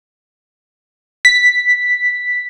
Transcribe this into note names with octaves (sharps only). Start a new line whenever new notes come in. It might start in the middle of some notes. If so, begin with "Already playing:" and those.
B6